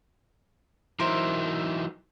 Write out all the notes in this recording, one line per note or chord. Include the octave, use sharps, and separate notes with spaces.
E3 F#3 D#4 A#4 C5 E5